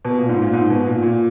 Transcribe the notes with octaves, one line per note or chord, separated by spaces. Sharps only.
B2
A#2
G#2
A#2
G#2
B2
A#2
A#2